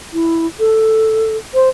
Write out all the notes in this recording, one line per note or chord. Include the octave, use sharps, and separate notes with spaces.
E4
A4
C5